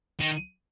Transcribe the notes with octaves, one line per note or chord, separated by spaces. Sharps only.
D#3